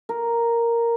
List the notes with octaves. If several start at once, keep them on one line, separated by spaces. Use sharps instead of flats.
A#4